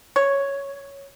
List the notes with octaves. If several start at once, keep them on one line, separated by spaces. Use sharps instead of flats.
C#5